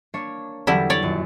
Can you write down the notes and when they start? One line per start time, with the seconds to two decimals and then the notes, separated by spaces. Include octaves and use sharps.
0.14 A#3 D4 C#5
0.67 E2 D3 F#3 G3 D4 E4
0.90 C#5 D5
1.02 D#1 F#2